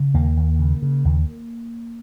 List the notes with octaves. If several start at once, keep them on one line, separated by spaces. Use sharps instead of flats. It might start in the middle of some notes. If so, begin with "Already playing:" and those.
Already playing: C#3
D#2 A#3
D#2
C#3
C#3
D#2